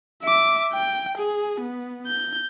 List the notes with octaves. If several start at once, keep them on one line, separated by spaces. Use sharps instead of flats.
E5 D6
G5
G#4
B3
G6